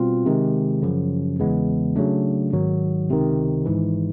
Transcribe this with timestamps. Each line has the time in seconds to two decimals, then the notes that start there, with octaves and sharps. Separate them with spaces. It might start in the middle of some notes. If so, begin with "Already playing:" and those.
Already playing: B2 G3 C4 F4
0.26 C3 D#3 G#3
0.82 F#2 C#3 F3
1.39 E2 C#3 E3 G#3 B3
1.96 C#3 F#3 A3 D4
2.52 G#1 G#2 D#3 F#3
3.09 C#2 C3 D#3
3.65 G#1 G#2 E3